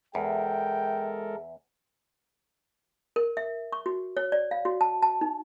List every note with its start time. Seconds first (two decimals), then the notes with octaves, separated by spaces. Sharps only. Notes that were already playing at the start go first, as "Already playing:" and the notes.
0.15 E2 G#3 A4 A#4 E5 G5
3.16 A#4
3.37 E5
3.72 C#6
3.86 F#4
4.17 C#5
4.32 D5
4.51 F5
4.65 F#4
4.81 A5
5.03 A5
5.21 D#4